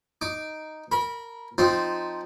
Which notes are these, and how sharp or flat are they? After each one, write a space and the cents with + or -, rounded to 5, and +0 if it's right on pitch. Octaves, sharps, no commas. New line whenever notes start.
D#4 +0 D6 +0
A#4 -15 B5 -25
F3 +5 C4 -5 D#4 +0